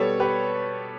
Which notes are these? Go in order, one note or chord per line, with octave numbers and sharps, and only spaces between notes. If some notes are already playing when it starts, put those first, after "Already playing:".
Already playing: B2 G3 B3 A4 C#5
G4 B4